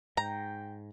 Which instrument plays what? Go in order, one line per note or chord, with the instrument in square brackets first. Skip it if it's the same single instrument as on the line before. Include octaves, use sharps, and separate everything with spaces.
[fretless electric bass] G#2 [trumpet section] G5 [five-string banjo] A#5